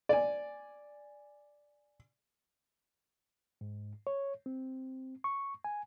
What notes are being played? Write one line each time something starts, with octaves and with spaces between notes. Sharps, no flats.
D5 G#5
G#2
C#5
C4
C#6
G#5